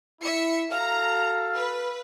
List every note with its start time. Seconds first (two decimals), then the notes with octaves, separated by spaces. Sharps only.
0.22 E4 E5 C#7
0.72 F#4 A4 F5 A#5
1.55 B4